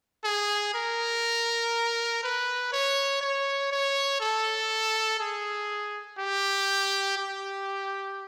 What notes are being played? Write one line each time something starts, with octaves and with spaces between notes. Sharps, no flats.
G#4
A#4
B4
C#5
C#5
C#5
A4
G#4
G4
G4